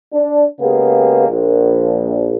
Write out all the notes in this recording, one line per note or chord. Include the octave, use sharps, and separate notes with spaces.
D4
C#3 G#3 A#3 B3 G4 G#4
A#1